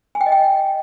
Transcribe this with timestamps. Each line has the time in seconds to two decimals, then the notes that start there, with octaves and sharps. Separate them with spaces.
0.15 G#5
0.21 G5
0.26 D#5
0.32 G5